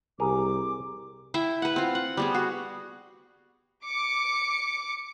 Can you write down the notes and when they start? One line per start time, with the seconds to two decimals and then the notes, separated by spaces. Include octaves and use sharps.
0.20 C2 G4 G#4 A#4 D6
1.34 E4 E5 G5
1.62 B4 F#5
1.76 C4 F4
1.95 F#5
2.17 G3 B3 G#4
2.34 F#4
3.85 D6 C#7